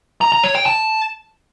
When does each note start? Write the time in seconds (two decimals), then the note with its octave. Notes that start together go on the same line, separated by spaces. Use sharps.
0.21 A#5
0.32 A#5
0.44 C#5
0.55 G5
0.66 A5